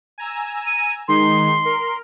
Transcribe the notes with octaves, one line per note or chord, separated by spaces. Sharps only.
G#5 A#5 E6
D#7
D#3 G#3 D#4 C6
A#4